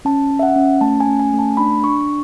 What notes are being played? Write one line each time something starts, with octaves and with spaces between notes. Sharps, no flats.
C#4 A5
C#4
E5
F#5
C#4
A3 A5
G#5
C#4
G#5
A3
A5
D4 B5
D4 C#6